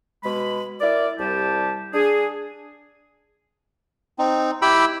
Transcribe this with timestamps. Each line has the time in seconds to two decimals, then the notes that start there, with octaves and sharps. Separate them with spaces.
0.24 B2 G#3 B5
0.81 E4 A#4 D5
1.19 C2 G3 G4 A5
1.94 D4 G#4
4.19 C4 D#4
4.62 E4 G4 G5 B5 E6